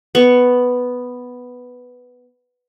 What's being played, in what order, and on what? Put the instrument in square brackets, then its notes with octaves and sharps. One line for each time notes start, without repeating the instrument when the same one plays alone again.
[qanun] B3 C#6